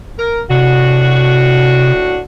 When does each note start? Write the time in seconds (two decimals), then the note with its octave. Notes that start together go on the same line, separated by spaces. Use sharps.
0.19 A#4
0.50 A2 C3 D4 F#4